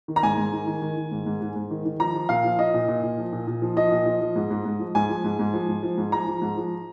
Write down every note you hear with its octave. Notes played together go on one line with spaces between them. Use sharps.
D#3
A#5
G#2 G#5
G#2
D#3
D#3
D#3
D#3
G#2
G#2
G#2
G#2
D#3
D#3
F3 A#5
F3
A#2 F5
F3
F3 D#5
A#2
A#2
A#2
F3
A#2
A#2
F3
F3 D#5
A#2
F3
F3
G#2
G#2
G#2
F3
G#2 G#5
F3
G#2
G#2
F3
G#2
F3
G#2
F3 A#5
F3
G#2
F3